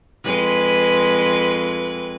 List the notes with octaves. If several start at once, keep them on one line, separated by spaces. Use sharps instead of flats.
F2 G#3 B4